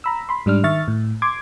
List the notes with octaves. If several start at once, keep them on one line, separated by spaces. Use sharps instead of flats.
A#5 B5 E6
B5 C6
G#2 G3 D4 F6
D#3 E5 C#6 F6 A6
A2
C6 D6 G#6